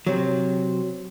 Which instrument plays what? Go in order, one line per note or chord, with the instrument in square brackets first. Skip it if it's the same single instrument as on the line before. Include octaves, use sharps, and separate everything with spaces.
[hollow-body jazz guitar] C3 F#3